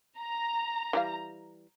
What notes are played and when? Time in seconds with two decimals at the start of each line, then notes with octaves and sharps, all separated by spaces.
0.19 A#5
0.93 E3 G3 F5